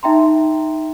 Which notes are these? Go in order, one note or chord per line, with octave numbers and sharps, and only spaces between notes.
D#4 E5 G5 A#5 C6